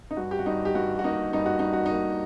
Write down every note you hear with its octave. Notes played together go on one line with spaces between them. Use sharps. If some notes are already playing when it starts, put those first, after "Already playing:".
D#4
G2 F#4
G4
F#4
G2 D#4
G4
G2 F#4
F#4
A#3 D#4
G2 D#4
F#4
G2 D#4
F#4
D#4
A#3